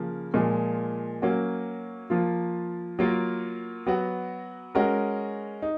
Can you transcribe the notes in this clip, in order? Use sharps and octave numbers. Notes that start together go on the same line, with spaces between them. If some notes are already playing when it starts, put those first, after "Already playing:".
Already playing: C#3 F3 A#3
A#2 F3 G#3
F#3 A#3 C#4 F#4
F3 A#3 F4
F#3 A#3 F4 A#4
F#3 B3 F#4
G#3 C#4 F#4 A#4
D#4